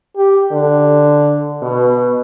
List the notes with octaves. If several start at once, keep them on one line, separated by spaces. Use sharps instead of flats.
G4
D3
B2